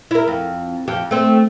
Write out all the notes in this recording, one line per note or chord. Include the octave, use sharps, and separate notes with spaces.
E4 A#4
F2
F2 G4
A3 C4